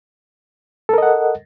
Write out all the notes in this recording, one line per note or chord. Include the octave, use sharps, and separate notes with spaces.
A4 A#4 D#5 F#5